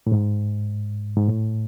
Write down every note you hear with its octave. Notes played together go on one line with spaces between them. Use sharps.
A2
G#2
G#2
A2